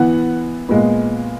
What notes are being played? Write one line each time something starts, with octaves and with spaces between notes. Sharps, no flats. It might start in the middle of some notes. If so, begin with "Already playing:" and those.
Already playing: E3 B3 F#5
A#2 G#3 B3